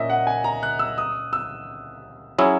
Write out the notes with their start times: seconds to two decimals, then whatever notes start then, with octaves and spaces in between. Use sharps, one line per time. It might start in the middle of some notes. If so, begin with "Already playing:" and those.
Already playing: A#2 A#3 C#4 D#5 E5
0.10 F#5
0.27 G#5
0.44 A#5
0.63 F#6
0.79 E6
0.98 D#6
1.33 E6
2.38 F#3 C#4 E4 G#4 E6